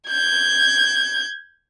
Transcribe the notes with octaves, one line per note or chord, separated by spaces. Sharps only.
G6 G#6